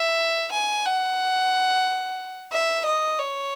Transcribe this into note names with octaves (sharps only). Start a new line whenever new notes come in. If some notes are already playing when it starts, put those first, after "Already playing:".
Already playing: E5
G#5
F#5
E5
D#5
C#5